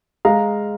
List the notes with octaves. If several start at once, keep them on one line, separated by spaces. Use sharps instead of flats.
G#3 F5 A#5